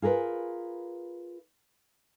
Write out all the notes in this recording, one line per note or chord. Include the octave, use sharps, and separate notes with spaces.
F4 G#4 A#4 B4